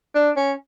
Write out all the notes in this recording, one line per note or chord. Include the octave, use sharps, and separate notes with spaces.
D4
C#4